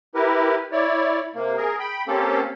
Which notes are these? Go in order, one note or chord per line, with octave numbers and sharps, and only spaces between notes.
E4 G4 A#4 B4
E4 C#5 D5
C3 A#3
G#4 A#4
G5 B5
A#3 C4 C#4 G4 A4